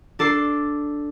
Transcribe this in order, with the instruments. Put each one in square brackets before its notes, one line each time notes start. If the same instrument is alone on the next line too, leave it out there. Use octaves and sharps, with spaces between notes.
[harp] D4 A4 D6 C7